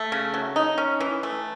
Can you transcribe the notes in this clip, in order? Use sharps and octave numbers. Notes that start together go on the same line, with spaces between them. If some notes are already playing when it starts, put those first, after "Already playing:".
Already playing: A3
C#3
F#3
D#4
C#4
E3
A3